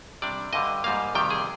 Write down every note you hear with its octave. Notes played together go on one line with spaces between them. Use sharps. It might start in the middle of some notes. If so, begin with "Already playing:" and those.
C3 G3 D4 D5
G2 D3 G3 D#5
G#2 G3 A#3 F5
F2 C3 D#3 G3 G5
G#4